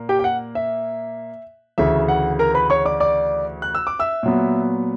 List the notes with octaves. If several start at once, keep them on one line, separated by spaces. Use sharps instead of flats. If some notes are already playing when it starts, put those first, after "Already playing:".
Already playing: A#2 A#3
G4 G5
G5
F#5
E5
D2 C#3 E3 E5
F#5
A#4 A#5
B4 B5
C#5 C#6
D5 D6
D5 D6
F#6
E6
D6
E5 E6
A#2 F#3 B3